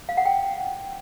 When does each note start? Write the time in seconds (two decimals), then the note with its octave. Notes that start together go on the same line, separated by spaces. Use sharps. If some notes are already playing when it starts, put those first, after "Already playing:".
0.09 F5
0.17 F#5
0.26 G5